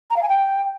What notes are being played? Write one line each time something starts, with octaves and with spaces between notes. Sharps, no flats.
A#5
F5
G#5
G5